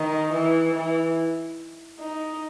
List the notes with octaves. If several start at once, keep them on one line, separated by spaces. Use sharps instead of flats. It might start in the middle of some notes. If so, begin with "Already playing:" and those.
Already playing: D#3
E3
E3
D#4